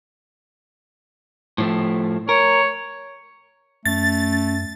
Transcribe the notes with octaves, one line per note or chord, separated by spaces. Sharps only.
A2 F3 A3
A#4 C#5
F#2 A3 C#4 A6